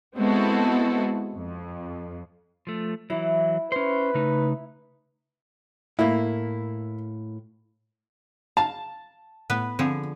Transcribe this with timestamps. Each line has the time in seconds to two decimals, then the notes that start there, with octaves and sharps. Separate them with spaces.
0.17 G#3 B3 C4 E4 F#4 A4
1.34 F2
2.67 F3 A3
3.10 E3 F#3 E4
3.72 C#4 B4 C5
4.15 C#3 A3 D#4
5.99 A2 A#3 E4
8.57 F5 A5 A#5
9.50 A2 B3 B4
9.79 D3 F3 C4 G#4